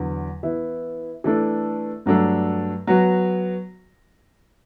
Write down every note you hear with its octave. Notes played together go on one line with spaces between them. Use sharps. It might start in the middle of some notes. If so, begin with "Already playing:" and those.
Already playing: E2 D3 F#3
E3 B3 E4
E3 A3 D4 A4
G2 F#3 A3 D4 A4
F#3 B3 F#4